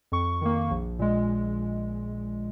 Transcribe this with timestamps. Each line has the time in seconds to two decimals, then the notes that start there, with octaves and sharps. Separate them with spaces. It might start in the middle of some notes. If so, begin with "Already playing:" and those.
0.12 F2 C#6
0.41 D#3 A#3
0.71 A#1
0.99 A#2 G#3